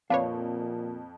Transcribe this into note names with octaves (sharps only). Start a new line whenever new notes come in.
F2 A#2 D4 B4 C#5 F5